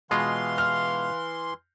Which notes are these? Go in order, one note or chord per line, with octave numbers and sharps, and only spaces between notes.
B2 E3 G#3 F4 F5 C6
F6